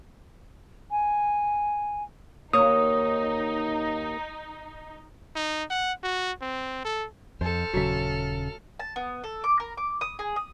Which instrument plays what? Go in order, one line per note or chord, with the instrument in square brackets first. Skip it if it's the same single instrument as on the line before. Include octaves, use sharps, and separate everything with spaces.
[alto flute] G#5
[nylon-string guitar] D#2 C#5 [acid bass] A#3 [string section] D#4 [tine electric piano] D#6
[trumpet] D#4
F#5
F#4
C4
A4
[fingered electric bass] F2 [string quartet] A4 F6 [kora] C5
[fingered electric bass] D#1 C#3 [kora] F#3 E5
[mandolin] A5
B3
A4
D6
A#4
D6
D#6
G#4
D#6